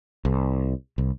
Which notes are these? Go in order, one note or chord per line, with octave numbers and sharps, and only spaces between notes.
C2
C2